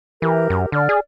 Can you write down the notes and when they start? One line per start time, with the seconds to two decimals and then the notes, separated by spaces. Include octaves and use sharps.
0.22 E3 G4 A#4
0.50 F#2
0.72 D3 D5 F6
0.89 G#4